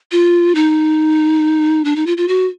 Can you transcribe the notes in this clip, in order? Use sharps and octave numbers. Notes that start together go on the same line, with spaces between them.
F4
D#4
D4
D#4
F4
F4
F#4